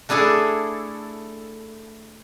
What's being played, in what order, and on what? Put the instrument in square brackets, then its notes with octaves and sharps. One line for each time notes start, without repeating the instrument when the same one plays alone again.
[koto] A3 D4 E4 G#4 A4